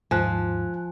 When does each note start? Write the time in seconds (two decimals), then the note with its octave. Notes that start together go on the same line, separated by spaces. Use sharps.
0.11 D#2 G#2 F3 G#5 F#6